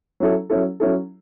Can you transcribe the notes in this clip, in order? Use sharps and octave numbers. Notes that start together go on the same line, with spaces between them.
F#3 C#4 E4 A4
F#3 C#4 E4 A4
F#3 C#4 E4 A4